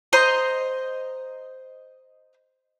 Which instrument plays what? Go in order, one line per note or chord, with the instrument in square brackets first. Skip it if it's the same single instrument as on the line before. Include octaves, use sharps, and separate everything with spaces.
[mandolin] C5 D#5 A#5 C6